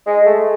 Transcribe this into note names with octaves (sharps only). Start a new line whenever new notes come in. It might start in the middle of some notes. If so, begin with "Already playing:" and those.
G#3
A3